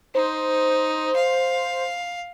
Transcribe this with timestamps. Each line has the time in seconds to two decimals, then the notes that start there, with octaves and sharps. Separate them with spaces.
0.15 D#4 C5
1.16 F5